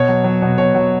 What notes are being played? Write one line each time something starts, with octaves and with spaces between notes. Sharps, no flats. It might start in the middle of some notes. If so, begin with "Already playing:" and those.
Already playing: B2 C#5
F#3
F#3
B2
B2 C#5
F#3